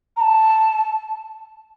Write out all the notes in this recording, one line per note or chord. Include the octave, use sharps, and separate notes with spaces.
A#5
A5